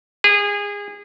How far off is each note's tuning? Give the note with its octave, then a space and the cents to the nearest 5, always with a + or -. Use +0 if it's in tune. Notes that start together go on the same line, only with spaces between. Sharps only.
G#4 -25